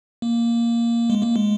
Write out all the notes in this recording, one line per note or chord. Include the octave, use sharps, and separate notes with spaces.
A#3
G#3
A#3
G#3